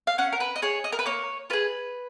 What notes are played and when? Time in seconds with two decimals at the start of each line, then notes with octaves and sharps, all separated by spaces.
0.07 F5
0.18 C#4 F#5
0.32 A#4
0.40 B4
0.56 D#5
0.62 G#4 C#5
0.84 D#5
0.92 A#4
0.99 B4
1.06 A#3 C#5
1.50 F4 G#4 B4